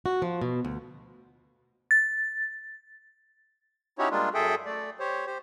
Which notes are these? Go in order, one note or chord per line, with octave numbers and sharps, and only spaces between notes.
F#4
F3
B2
D2
A6
C#4 D#4 E4 F#4 G4 C#5
G3 G#3 A#3 D4 F4
F#2 G#4 A4 E5 G5
A3 D5
G4 C5 C#5
G4 C5